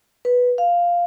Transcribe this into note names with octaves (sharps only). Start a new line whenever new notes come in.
B4
F5